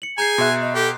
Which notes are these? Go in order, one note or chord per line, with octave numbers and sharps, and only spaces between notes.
C#7 F#7
G#4 G#5 A#5 G6 C7
B2 E5 C6 F#6
D#5
G4 A4